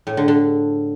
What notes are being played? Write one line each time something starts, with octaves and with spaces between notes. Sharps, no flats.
A2
D3
D3